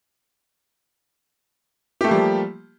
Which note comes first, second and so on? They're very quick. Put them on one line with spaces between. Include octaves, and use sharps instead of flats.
G4 A3 A#3 G3 F3